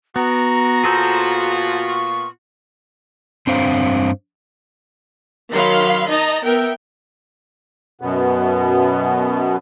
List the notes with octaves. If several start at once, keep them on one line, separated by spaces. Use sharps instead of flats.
B3 F#4 A#5
A#2 B3 F4 G#4 A4 C5
C#6
G2 C4 D4 C5 F5
D#3 F#3 F5 B5 C6
D#4 D#5 A5 A#5
B3 A#4 E5 G5
F#2 B2 B3